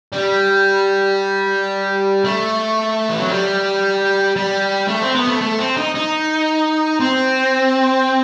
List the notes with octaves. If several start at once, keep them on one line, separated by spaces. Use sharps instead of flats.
G3
A3
E3
F#3
G3
G3
A3
C4
B3
A3
A3
C4
D#4
D#4
C4